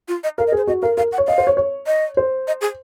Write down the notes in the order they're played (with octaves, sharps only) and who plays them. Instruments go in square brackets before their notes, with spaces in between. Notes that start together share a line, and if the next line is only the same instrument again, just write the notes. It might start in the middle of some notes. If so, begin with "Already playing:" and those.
[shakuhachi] F4
D#5
[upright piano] A#4 [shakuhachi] F5
[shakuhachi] D#5
[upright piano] G#4 [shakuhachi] C5
[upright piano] F#4 [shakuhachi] D#5
[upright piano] A#4 [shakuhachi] F5
[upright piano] A#4 [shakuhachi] F5
[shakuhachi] F#5
[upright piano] C#5
[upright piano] D#5 [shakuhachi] F5
[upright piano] C5
C#5
C#5
[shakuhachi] D#5
[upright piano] C5
[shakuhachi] D#5
G#4